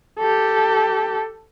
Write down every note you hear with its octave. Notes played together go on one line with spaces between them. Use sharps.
G4 A4